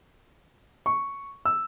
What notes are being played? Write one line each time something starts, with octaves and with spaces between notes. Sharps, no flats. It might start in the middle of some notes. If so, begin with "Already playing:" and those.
C#6
E6